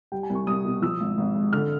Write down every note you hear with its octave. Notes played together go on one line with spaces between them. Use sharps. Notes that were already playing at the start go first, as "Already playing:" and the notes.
G3 G5
G#5
C2
C#6
C2 D#6
B2
F3 E6
G#1
G#1
G#2
D3 F6